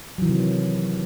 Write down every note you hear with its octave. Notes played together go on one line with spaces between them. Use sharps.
C3 D#3 E3 F#3